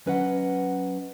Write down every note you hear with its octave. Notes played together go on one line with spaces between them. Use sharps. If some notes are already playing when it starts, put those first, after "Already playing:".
F#3 C#4 B4 D#5 E5 F#5